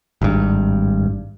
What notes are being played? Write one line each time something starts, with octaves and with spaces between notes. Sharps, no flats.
G#1 G2